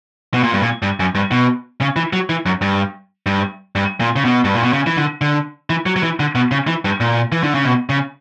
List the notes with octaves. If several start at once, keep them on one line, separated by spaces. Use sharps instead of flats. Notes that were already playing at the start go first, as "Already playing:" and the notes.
B2
A#2
G2
A#2
G2
F#2
G2
B2
C#3
E3
F#3
E3
F#2
G2
G2
G2
A#2
C#3
B2
G2
A#2
B2
C#3
E3
D3
D3
E3
F#3
F#3
E3
D3
B2
C#3
E3
G2
A#2
E3
D3
C#3
B2
C#3